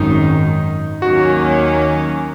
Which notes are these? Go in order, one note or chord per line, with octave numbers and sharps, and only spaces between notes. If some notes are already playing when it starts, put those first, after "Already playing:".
Already playing: G#1 F#2 D#3 D#4
D#2 D#3 F#3 A#3 C#4 F#4